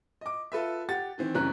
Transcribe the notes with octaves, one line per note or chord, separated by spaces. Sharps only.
D#5 D6
F4 A4 B4 E5
G4 F#5 A6
D#3 E3 C4
F#1 G3 C4 C#4 A#5 F#6